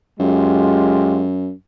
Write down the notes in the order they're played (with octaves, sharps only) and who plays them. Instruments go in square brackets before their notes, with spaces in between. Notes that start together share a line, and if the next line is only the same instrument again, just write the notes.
[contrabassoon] F#2 [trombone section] G#3 F4 G4